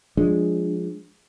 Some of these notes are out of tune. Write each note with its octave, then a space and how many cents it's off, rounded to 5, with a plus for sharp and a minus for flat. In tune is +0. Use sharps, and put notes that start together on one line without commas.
F3 +15 G#3 +0 D4 +0